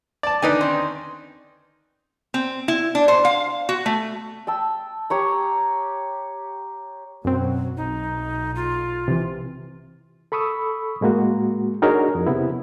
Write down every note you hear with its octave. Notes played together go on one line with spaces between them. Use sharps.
D5 A5
D3 D#3 D#4 B4 D5 G#5
C4 C#4
C4
E4
D4
C5
F5
F#4
A3
G5 A5 E6
G4 C#5 A#5
F#2 B2 F#3 C4
B1 D#4
F4
C3 E3
A4 B5 C#6 D#6 E6
A2 G#3 A#3 F#4
D4 D#4 F#4 G#4 A#4 C#5
F2
C3 B3 E4